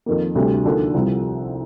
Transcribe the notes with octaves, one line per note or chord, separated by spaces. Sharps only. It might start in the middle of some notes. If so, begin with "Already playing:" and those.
F2 D#3 A#3
D2 C3 G3 D4
D#2 D3 F3 A#3 D4
C2 C3 F3